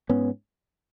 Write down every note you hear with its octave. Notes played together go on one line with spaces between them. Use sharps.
G#2 B3 C#4